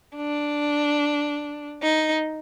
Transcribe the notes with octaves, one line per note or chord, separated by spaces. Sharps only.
D4
D#4